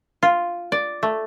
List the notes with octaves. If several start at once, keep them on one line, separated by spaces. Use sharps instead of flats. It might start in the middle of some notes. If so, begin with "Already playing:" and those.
F4
D5
A3